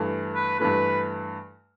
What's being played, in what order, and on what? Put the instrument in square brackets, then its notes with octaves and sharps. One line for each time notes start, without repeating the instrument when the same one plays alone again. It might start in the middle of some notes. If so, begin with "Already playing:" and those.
Already playing: [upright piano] G2 E3 A3
[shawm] B4
[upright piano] G2 E3 A3 [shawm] B4